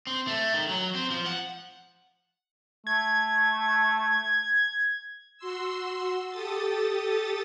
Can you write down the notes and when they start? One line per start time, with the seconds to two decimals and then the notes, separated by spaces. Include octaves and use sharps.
0.07 C4
0.28 A3
0.53 D#3
0.69 F#3
0.95 C4
1.10 F3
1.26 F#5
2.87 A3 G#6
5.38 F#4 C6 E6
6.30 G4 A4 D#6 A6